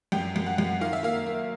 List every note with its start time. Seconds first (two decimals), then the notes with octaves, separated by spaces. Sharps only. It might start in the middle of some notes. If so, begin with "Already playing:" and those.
0.12 F#2 G5
0.36 F#2
0.46 F#5
0.58 F#2
0.81 D#3 F5
0.93 E5
1.03 A#3 F5
1.27 A#3